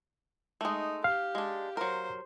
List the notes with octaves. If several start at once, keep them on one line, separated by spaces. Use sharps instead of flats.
G#3 A3 D#4
G4 F5
G#3 D4
F#3 A#4 C5